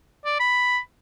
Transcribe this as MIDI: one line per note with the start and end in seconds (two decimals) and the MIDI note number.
0.25 0.40 74
0.40 0.78 83